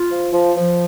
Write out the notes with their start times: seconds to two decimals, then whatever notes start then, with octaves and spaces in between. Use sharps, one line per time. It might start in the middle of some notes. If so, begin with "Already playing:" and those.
Already playing: F4
0.10 F3
0.33 F3
0.56 F3